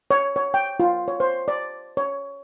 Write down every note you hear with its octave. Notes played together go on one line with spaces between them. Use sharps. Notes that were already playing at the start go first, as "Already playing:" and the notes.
C#5
C#5
G5
F4
C#5
C5
D5
C#5